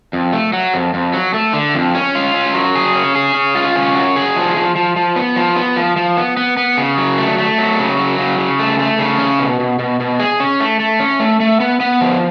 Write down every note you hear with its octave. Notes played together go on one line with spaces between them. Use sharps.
F2
A3
F#3
F2
F2
F#3
A3
D3
F2
C#4
F4
C#4
F#3
G#4
C#4
G#4
C#4
F4
C#4
F#3
G#4
F3
F3
F3
F3
B3
F3
B3
F3
F3
B3
B3
B3
C#3
F#3
A3
A3
F#3
C#3
F#3
C#3
C#3
A3
A3
C#3
C#4
B2
B2
B2
B2
G#4
C#4
A3
A3
C#4
A3
A3
B3
B3
F3